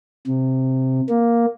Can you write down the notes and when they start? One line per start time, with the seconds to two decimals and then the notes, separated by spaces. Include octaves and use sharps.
0.27 C3
1.09 A#3